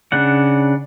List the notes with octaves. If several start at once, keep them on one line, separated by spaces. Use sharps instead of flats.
C#3 D4 F#5